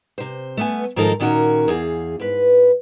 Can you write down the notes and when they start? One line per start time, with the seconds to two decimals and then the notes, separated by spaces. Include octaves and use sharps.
0.18 C3 C5
0.57 A3 B3 G#5
0.96 G#2 D#3 F3 D#4 A4 A#4
1.20 A#2 D#3 C#4 F#4 A#4
1.68 E2 G#4 F5
2.19 G#2 B4